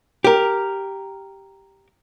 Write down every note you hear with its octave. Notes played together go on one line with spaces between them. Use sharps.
G4 A#4